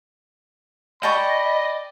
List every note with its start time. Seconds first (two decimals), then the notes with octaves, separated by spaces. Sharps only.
1.03 D5 D#5 G5 A5 B5 C#6